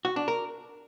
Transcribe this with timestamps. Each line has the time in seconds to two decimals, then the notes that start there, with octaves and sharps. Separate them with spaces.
0.05 F#4
0.16 D4
0.28 A#4